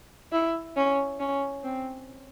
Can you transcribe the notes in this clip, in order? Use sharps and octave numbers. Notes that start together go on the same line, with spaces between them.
E4
C#4
C#4
C4